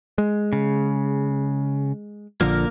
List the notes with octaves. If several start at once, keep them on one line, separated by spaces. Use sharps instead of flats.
G#3
C#3
A#1 D3 F3 A#3 A#4